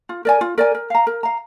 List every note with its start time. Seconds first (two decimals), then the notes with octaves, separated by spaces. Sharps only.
0.09 F4
0.25 A#4 D5 G#5
0.41 F4
0.58 A#4 D5 G#5
0.75 A#4
0.90 F5 A#5
1.07 A#4
1.23 F5 A#5